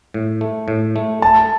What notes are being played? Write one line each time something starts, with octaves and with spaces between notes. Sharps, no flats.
A2
A3
A2
A3
A3 A5